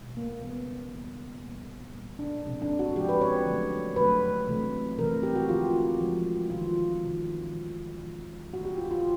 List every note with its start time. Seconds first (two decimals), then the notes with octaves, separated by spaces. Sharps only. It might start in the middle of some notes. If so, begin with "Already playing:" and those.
Already playing: B2 G#3
0.17 A#3
0.43 C#3 E3 G3 A#3 B3
0.94 C#3 E3 G3 A#3
1.43 A#2 G3 A#3
1.95 A#2 G3 A#3
2.19 D4
2.45 C3 F3 G#3
2.62 D4
2.79 F#4
2.96 C3 F3 G#3 G4
3.09 B4
3.22 C#5
3.46 D3 F#3 A3
3.96 D3 F#3 A3 B4
4.48 C3 E3 A3
4.98 C3 E3 A3 A#4
5.23 G4
5.36 F#4
5.49 D3 F3 G#3 F4
6.00 D3 F3 G#3
6.50 C3 D#3 G#3 F4
7.00 C3 D#3 G#3
7.52 C3 E3 G#3
8.02 C3 E3 G#3
8.53 D3 F#3 A3 F#4
8.65 G4
8.78 F4
8.91 F4